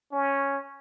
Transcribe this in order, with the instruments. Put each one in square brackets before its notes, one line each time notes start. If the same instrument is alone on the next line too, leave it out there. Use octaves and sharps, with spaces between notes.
[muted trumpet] C#4